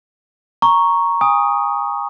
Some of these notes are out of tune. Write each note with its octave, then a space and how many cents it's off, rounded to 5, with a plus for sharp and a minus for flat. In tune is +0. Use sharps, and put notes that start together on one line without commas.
A#5 +0 C#6 +0
G#5 -35 D#6 +0